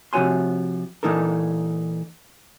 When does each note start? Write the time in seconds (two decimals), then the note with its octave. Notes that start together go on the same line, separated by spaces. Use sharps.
0.13 C3 F3 F#4 C#5 G#5 C6
1.03 A#2 E3 D#4 A4 A#4